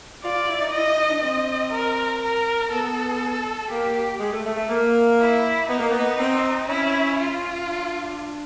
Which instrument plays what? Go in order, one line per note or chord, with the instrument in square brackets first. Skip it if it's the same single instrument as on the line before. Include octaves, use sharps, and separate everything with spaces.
[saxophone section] F4 [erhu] D5
[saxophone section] F4
E4
D#4
[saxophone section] E4 [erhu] D#5
[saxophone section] D#4
D#4
D4
[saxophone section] C4 [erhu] D#5
[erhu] A#4
A#4
[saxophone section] B3 [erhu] A4
[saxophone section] A#3 [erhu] G4
[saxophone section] G#3
A3
A3
A3
A#3
[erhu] E4
[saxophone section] B3 [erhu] D#4
[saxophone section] A#3
B3
C4
[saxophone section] C#4 [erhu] E4
[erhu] F4
[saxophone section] D4